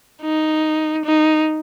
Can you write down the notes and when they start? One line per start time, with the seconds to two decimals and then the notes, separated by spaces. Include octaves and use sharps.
0.22 D#4
1.05 D#4